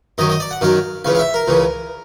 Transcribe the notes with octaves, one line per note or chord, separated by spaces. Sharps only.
F#2 D#3 F#3 D#5
D#5
D5
F#5
F#2 D#3 F#3 F5
C#2 C#3 E3 F5
F5
E5
A#4
C#2 C#3 E3